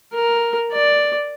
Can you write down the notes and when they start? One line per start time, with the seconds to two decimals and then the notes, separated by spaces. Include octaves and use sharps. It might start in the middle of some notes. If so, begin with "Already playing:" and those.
0.14 A#4
0.72 D5